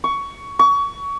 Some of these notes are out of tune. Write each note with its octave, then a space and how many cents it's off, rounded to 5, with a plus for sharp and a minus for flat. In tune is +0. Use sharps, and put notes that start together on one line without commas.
C#6 +15
C#6 +25